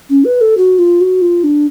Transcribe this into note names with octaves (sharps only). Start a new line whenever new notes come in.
C#4
B4
A4
F#4
F4
F#4
F4
D4